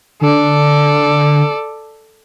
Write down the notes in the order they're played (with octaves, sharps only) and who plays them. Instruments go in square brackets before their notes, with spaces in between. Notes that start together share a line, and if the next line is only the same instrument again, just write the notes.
[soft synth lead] D3 [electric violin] A4 D5